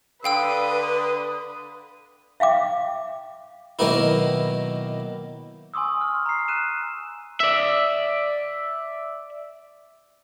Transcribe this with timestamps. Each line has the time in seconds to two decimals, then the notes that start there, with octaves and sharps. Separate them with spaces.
0.24 D3 B4 F5 G5 D#6 E6
2.40 E5 F5 G5 D6
3.79 B2 D#3 F#3 A#3 B3 E4
5.74 G#5 C6 C#6 D#6 E6
6.01 F6
6.26 A#5 C7
6.48 F#6 D#7 E7
7.40 D5 E5